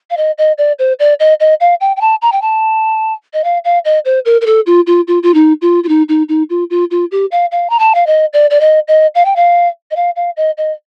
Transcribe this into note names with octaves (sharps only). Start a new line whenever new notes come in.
F5
D#5
D#5
D5
C5
D5
D#5
D#5
F5
G5
G5
A5
A#5
G5
A5
D#5
F5
F5
D#5
C5
A#4
A#4
A4
F4
F4
F4
F4
D#4
F4
F4
D#4
D#4
D#4
F4
F4
F4
G4
F5
F5
A#5
A5
F5
D#5
D5
D5
D#5
D#5
F5
G5
F5
D#5
F5
F5
D#5
D#5